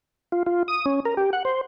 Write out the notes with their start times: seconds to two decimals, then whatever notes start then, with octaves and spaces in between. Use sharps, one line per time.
0.32 F4
0.46 F4
0.68 D#6
0.86 C#4
1.05 A#4
1.17 G4
1.33 F#5
1.45 C5